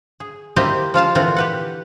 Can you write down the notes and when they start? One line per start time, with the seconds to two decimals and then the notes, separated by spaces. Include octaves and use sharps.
0.20 G#4
0.56 A#3 C4 E4 G4 D#5
0.94 F3 F4 F5 A5
1.15 A#2 D3 E3 C4 F4 F#5
1.36 G4 B4 F#5